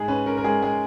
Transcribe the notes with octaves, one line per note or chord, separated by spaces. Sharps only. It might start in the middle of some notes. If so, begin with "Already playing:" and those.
Already playing: G#2 G#3 G#4
C#4 B4
C#4 A#4
A#4
G#3 G#4
G#3 G#4